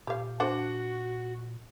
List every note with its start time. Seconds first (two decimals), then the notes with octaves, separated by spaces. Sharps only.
0.07 A#2 G4 F5
0.40 D4 F#4 C5 F#5